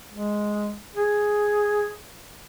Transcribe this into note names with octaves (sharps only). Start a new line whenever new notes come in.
G#3
G#4